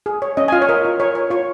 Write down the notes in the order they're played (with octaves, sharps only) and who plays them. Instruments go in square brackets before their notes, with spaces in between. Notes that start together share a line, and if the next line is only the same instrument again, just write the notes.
[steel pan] G#4
C#5
C#4 D#5
G#5
F4 F5
C#5
A#4 D#5
F4
A#4 C#5
C#5
F4 C#5